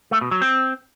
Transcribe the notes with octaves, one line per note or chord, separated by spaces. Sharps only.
A3
B2
F#3
C4